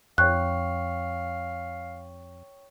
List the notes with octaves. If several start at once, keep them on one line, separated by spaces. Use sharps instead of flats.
F2 C#5 F5 G5 C#6 F#6